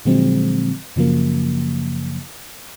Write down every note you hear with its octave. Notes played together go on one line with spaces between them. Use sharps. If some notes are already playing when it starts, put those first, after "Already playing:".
A#2 D3 F3 F#3 G#3 C4
F#2 C#3 F3 F#3 A#3